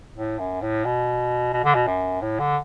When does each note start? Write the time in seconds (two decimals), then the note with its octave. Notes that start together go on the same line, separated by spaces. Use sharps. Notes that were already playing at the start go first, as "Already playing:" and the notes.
0.16 A2
0.39 F#2
0.61 A2
0.85 B2
1.53 B2
1.64 D3
1.75 B2
1.87 F#2
2.22 A2
2.39 D3